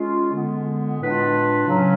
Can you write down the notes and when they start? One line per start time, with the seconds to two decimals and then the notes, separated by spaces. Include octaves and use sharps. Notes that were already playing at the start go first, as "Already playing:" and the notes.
Already playing: G#3 C#4 F4 G#4
0.32 D3 G#3 B3
0.99 A2 G#3 D4 F4 B4
1.66 C#3 F#3 C#4